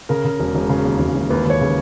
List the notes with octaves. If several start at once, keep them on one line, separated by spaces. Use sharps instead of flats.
C#3 A#4
C#3
E1
E1
C#3
D#2
E1
E1
D#2 B4
D#2 C#5
C#3